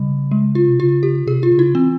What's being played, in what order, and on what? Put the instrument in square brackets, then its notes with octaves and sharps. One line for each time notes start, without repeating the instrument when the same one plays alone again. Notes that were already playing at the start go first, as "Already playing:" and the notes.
Already playing: [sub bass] C#3 [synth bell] G3
[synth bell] G#3
F4
[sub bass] C3
[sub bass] C#3 [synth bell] F4
[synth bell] G4
[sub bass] C3 [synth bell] G#4
[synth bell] F4
[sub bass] C#3
[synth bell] E4
[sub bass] E3 [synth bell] C4